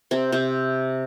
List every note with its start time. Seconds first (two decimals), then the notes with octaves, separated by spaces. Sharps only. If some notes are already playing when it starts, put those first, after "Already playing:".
0.11 C3 C4
0.32 C3 C4